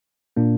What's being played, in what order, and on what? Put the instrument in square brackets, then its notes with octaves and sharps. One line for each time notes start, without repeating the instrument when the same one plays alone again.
[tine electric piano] A#2 A#3 D4